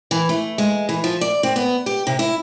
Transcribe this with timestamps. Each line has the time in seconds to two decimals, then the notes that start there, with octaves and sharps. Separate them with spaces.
0.11 E3
0.29 A3
0.58 G#3
0.89 E3
1.04 F3
1.21 D5
1.43 C4
1.56 B3
1.86 G4
2.07 C3
2.19 E4